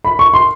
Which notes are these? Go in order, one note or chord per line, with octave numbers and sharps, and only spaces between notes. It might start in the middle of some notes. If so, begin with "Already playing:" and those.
B5
C#6
C6